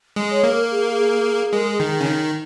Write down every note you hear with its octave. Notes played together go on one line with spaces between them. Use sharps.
G#3
C#5
A#3
A#4
G#4
G#4
G#4
G#3 A#4
G#4
D#3
C#3
D#3